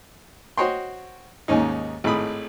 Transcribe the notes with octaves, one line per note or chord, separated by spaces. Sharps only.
F#4 C5 C#5 D#5 G5 C6
D#2 G#2 C#4 D#4
G#1 A2 B5 D#6